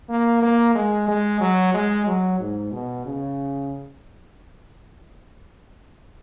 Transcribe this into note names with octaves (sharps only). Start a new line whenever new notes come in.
A#3
A#3
G#3
G#3
F#3
G#3
F#3
G#2
B2
C#3